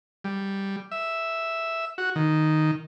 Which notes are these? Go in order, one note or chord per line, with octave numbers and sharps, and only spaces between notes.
G3
E5
F#4
D#3